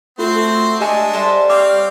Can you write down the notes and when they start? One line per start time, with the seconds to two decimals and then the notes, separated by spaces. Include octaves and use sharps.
0.19 A3 C4 F4 F#4 A4 C5
0.80 G#3 D4 G4 D#5 E5 G#5 A5 C#6
1.14 G3 A4 C5 E5
1.50 C4 C#5 F5 G5 D6